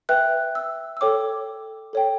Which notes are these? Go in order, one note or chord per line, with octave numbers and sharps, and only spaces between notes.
B4 E5 G5 F#6
E6
E6
A4 C#5 G5 D6
A4 C#5 G5